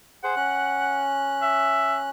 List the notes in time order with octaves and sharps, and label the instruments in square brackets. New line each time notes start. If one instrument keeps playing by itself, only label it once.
[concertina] G#4 C5 [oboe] F#5
[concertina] C#4 F#6
[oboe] E5